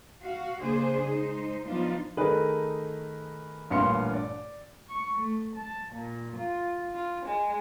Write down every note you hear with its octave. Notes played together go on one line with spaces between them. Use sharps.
F#4 F5
C#3 A#3 D4 G#4 C5
G#3 D#4 C5
F3 B3 D4 D#4 F4
D#3 A3 D#4 G#4 A#4 B4
A1 G2 A#2 F5 C6 C#7
D5
C#6
A3
A5
A#2
F4
F4
G#3